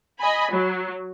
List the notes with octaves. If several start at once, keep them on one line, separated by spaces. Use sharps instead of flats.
D#5 G#5 B5
F#3